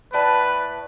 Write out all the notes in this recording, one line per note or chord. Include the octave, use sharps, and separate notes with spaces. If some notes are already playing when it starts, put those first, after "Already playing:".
A2 B4 D5 A5